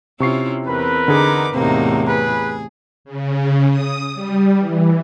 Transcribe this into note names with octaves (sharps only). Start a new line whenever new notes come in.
C3 C#4 E4 F4 C#6 C7
E2 C4 A#4 B4
D3 D#4 G#4 D6
E2 A2 C3 A#3 C4 D#4
G#4 B4 A#5
C#3
D#6
G3
E3